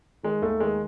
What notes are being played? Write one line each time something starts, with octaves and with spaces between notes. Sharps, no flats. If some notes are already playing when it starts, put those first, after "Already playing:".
D#3 G#3
D#2 A3
D#3 G#3